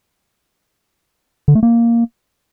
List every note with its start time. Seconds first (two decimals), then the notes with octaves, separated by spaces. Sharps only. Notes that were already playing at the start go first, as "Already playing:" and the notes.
1.48 D3
1.55 A3
1.63 A#3